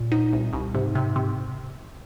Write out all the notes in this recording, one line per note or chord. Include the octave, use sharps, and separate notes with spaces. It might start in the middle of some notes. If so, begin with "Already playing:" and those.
Already playing: A#2
D#4
C2
C2
G#2 C3
C3
C3